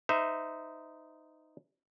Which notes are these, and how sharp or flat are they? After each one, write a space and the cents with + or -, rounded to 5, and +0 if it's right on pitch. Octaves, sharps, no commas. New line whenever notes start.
D#4 +0 C5 -35 E5 +0